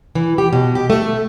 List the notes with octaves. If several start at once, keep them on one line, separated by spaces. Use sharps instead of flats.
E3
G4
B2
G4
A3